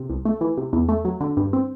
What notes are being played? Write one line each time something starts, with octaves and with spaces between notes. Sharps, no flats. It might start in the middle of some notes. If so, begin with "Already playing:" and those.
Already playing: C3
C2
A3
E3
C3
E2
A3
F#3
D3
G2
C4